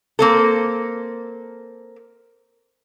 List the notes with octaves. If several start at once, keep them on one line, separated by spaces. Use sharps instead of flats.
A#3 C4 A4